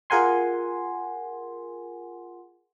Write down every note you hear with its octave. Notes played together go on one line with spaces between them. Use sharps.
F4 G#4 A#4 F#5 G#5 C6